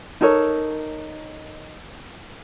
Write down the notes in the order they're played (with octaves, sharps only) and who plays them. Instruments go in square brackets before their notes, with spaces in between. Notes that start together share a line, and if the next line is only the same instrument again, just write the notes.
[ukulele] D#4 A4 A#4 C#5